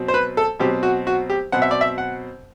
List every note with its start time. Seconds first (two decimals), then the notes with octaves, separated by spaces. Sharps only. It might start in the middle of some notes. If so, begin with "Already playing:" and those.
Already playing: B2 F#3 C4
0.08 C5
0.14 B4
0.37 A4
0.60 B2 F#3 C4 G4
0.83 F#4
1.07 F#4
1.30 G4
1.52 B2 F#3 C4 F#5
1.62 E5
1.71 D5
1.81 E5
1.98 F#5